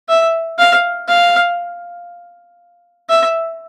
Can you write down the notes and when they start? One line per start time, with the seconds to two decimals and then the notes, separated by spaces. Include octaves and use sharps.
0.09 E5
0.59 F5
1.08 F5
3.09 E5